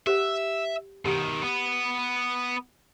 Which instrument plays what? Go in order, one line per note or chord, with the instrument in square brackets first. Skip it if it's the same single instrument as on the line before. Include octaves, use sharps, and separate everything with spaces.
[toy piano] G4 C5 F#5 [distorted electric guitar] E5
[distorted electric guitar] B2 D#3 [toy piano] G4 F#5
[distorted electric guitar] B3